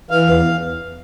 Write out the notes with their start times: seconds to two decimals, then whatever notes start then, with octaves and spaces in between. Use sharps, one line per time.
0.11 E3 F5
0.28 E2